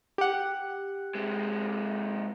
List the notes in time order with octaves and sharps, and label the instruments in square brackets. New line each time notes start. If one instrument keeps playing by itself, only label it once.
[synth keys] G4 F#5
[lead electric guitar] C3 G#3